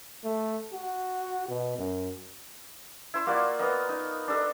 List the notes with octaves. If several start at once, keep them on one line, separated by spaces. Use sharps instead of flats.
A3
F#4
B2
F#2
E4 C5 E6
A#3 F4 F#4 D5
B3 A#4 D#5
D#4
D4 A4 D#5